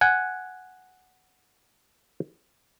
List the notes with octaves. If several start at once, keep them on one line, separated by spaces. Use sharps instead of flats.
F#5 G#5